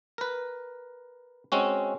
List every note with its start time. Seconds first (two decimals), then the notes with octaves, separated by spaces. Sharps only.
0.18 A#4 B4
1.52 G#3 C4 C#4 F#4